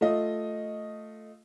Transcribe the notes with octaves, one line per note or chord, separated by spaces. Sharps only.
A3 F4 D#5